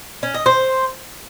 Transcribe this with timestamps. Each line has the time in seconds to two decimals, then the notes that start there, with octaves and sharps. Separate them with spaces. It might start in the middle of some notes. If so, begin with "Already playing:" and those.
0.23 C#4
0.34 D#5
0.46 C5